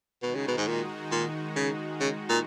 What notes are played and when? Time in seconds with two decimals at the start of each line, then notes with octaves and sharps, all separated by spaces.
0.22 B2 D#3 G#3 D#4 F#4
0.35 C#3
0.48 B2
0.58 G#2
0.68 A#2
1.12 A#2
1.56 C#3
2.00 C#3
2.30 A#2